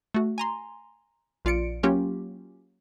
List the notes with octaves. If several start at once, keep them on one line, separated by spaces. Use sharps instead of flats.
A3 F#4
G#5 A#5 C6
A#1 F4 D5 C#7 D7
F#3 A#3 C#4 F4 G4